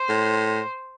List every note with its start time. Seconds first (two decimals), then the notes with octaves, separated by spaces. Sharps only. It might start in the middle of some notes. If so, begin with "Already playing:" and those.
Already playing: C5
0.09 A2